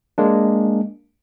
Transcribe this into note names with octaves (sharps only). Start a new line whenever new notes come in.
G#3 A#3 D4